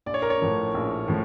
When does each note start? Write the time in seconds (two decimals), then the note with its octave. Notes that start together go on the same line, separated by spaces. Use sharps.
0.06 A#1 D5
0.14 C#5
0.22 A#4
0.30 C#5
0.41 A2 F3 A#3
0.74 A#1
1.08 A2 F3